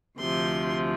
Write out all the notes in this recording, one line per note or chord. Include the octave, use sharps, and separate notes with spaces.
D2 C3 F3 C6